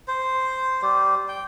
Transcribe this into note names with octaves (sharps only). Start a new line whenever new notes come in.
C5
G3
G5